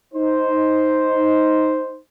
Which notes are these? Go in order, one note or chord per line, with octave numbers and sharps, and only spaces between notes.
D#4 C5